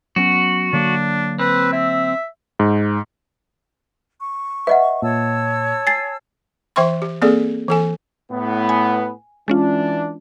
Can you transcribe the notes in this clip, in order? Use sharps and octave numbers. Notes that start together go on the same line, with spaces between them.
F#3 B3 C#4 F#4
D3 F#3 A#3 D4
C4 B4
E5
G#2
C#6
B4 D#5 E5 F#5
A#2 C#5 A5 E6
G#5 A6 C7
E3 C5 E5 G5 C6 C#6
G4
A#3 C4 G#4 A4 D5
E3 A4 G#5
A2 B3
G#5
E3 G#3 C#4 D4 F4